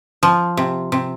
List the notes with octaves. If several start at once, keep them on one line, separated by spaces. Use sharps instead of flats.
F3
C3
C3